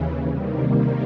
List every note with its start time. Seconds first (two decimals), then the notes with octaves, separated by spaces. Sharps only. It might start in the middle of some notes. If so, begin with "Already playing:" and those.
Already playing: D#2 C#3 E3
0.27 C3 D#3 G3 A#3